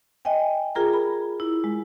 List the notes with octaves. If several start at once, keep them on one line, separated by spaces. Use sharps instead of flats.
D#5 E5 G5 G#5
F4 G#4 A#4 A#5
B5
E4
G#3